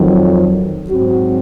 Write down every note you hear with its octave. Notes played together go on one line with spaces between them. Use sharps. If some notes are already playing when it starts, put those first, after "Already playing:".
Already playing: F2 D#3 F#3
G#2 F#3 C4 F#4